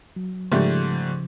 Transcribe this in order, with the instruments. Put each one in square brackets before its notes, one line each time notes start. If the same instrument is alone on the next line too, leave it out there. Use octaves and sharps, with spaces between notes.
[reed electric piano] F#3
[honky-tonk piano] G#2 G3 A3 [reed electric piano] C#3 F3